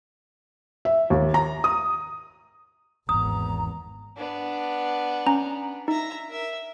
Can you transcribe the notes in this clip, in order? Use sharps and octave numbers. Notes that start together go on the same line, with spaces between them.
E5
D#2
A#5
D#6
G#1 E2 G#2 B3 A#5 D#6
B3 D4
C#4 A#5
D#4 E5 A#5
A#4 E5